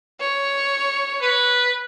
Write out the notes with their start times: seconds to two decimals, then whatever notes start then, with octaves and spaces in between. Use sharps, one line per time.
0.21 C#5
1.22 B4